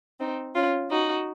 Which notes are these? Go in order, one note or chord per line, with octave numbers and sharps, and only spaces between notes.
C4 D#4
C#4 F4
D#4 F#4